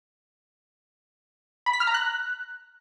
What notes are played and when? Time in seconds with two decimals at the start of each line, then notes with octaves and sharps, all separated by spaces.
1.66 B5
1.73 B6
1.80 F6
1.87 A#5
1.94 F#6